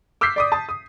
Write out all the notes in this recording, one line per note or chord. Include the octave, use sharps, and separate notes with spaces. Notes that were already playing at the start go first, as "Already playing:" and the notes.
D6 E6 F6 G6 B6 C7
D5 D6 D#6
A5 D#6
D#6